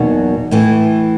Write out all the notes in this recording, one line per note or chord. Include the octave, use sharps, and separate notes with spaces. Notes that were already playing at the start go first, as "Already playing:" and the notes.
Already playing: E2 B2 F#3 A#3 D#4
A2 E3 A3